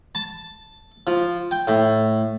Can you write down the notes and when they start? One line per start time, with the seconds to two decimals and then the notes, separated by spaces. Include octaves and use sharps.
0.15 A5
1.07 F3
1.51 G5
1.67 A2